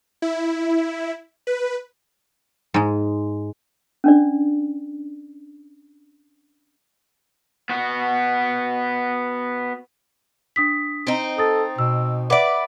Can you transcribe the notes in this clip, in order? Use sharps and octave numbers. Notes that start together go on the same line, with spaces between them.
E4
B4
G#2 G#3
C#4 D4 D5
B3 F#4
D4 D#6 B6
C4 D#4
A4 D#6 A6
B2 E6
B4 D5 E5 F#5 D6